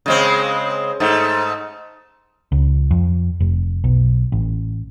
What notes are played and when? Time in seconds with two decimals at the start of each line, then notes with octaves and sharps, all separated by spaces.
0.06 C#3 G#3 C4
1.00 G#2 A3
2.52 C#2
2.91 F2
3.40 F1
3.84 B1
4.32 A1